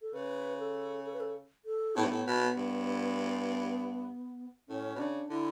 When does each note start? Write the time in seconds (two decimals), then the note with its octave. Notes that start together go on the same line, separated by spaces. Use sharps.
0.02 A4
0.13 C#3 B4
0.59 A4
1.05 A4
1.13 B4
1.20 A4
1.65 A4
1.96 A2 B3
2.04 G2
2.11 A2
2.27 B2
2.41 B3
2.57 G2
4.69 A2 C#4
4.95 B2
4.99 C#3 D4
5.30 D3 E4